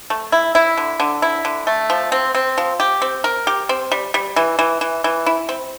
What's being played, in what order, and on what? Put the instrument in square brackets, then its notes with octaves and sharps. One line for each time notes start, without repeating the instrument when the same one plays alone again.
[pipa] A3
E4
E4
D3
D3
E4
D3
A3
F3
C4
C4
F3
G4
C4
A#4
G4
C4
G3
G3
E3
E3
E3
E3
E4
C4